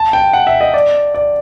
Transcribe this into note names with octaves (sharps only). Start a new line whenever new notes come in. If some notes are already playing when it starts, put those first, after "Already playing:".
Already playing: A5
G5
F#5
E5
D#5
D5
D5